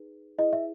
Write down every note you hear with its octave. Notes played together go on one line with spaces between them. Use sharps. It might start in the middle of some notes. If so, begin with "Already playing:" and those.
Already playing: D#4 G#4 B4
E4 G#4 B4 D#5
E5